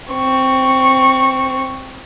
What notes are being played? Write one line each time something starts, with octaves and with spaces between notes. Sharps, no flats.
C4 C#6